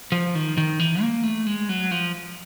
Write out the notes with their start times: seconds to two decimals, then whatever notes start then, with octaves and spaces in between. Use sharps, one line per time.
0.12 F3
0.35 D#3
0.57 D#3
0.80 E3
1.02 A#3
1.23 A3
1.47 G#3
1.69 F#3
1.91 F3